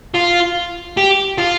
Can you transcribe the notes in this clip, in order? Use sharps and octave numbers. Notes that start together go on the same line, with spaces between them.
F4
G4
F4